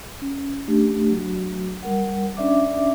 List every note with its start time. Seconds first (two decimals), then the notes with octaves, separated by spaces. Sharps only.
0.22 C#4
0.68 A3 D4 G4
1.10 F#3 F#4
1.82 G3 A#4 F#5
2.37 C#4 D4 D5 E5 D6